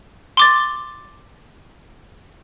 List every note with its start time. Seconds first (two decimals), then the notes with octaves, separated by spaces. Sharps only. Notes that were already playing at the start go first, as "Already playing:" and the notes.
0.37 C6 D6 A6